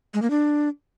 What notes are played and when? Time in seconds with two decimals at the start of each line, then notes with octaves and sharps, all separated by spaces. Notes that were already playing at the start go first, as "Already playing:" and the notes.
0.14 G#3
0.22 A#3
0.30 D4